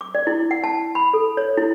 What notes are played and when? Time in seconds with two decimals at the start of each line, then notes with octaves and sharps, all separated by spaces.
0.01 D6
0.15 D5
0.27 E4
0.51 F#5
0.64 A5
0.95 B5
1.14 A4
1.37 C#5
1.57 E4